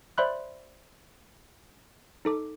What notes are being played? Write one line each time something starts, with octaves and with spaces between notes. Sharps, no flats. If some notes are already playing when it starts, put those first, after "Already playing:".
C5 D5 E5 B5 C6 F#6
D#4 A4 D6